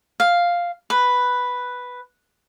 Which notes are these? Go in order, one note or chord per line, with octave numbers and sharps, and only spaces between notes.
F5
B4